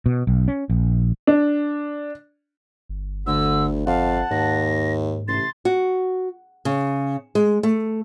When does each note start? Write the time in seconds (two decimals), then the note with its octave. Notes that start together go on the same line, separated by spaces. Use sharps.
0.06 B2
0.27 B1
0.48 C#4
0.70 A#1
1.27 D4
2.89 G1
3.27 D2 D3 E6
3.87 F2 F5 F#5 A5
4.31 D#2 G#2 A#6
5.28 A1 C3 C6 A6
5.65 F#4
6.65 C#3
7.35 G#3
7.63 A3